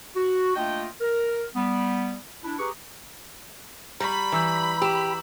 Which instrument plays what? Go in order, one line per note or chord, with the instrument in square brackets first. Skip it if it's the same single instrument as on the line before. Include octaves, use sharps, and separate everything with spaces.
[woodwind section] F#4
A3 A#3 D4 F4 D#5 G5
A#4
G3 B3
D4 E4
G4 G#4 B4 A#5 C#6
[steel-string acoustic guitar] G3 [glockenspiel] A#5 C#6 [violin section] B5
[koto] E3 [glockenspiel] A#5 E6 G6
[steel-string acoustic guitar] G4 [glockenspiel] E6 E7